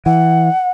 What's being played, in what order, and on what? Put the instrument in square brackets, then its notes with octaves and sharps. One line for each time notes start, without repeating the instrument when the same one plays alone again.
[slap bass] E3 [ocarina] F#5